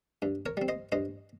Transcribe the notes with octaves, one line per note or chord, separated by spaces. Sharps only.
G2
A#4 C#5
G3 C4
C5 D#5
G2 C5 D#5